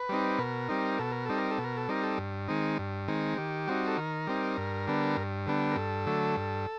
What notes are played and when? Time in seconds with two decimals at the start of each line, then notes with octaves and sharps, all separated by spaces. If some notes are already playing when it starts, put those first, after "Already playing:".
Already playing: B4
0.09 G3 C4 D#4
0.38 B2 A#4
0.68 G3 C4 D#4
0.99 B2 A4
1.12 A#4
1.25 G3 C4 D#4 A4
1.38 A#4
1.51 A4
1.58 B2
1.64 A#4
1.77 A4
1.89 G3 C4 D#4 A#4
2.03 A4
2.18 G2
2.48 D#3 G#3 C4 D#4
2.78 G2
3.08 D#3 G#3 C4 D#4
3.38 D#3 G4
3.67 G3 C4 D#4 F#4
3.87 A4
3.98 D#3 A#4
4.27 G3 C4 D#4
4.57 G2
4.87 D3 G3 B3 D4
5.17 G2
5.46 D3 G3 B3 D4
5.71 A#4
5.76 G2 A4
6.06 D3 F#3 A3
6.37 G2